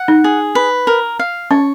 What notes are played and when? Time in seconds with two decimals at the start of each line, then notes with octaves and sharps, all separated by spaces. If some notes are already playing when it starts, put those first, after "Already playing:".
Already playing: F#5
0.08 D#4
0.24 G#4
0.55 B4
0.87 A#4
1.19 F5
1.51 C#4 C#5